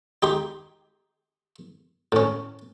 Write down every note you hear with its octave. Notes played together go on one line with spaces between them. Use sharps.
D#4 G4 C6
A2 C#4